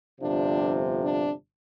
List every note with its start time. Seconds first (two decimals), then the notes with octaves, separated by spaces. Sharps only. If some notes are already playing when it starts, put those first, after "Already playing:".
0.20 G1 F2 C3 F3 D4
1.02 D4